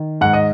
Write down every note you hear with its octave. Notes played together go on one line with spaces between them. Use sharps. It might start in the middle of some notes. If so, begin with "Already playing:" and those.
Already playing: D#3
G#2 F#5
D#5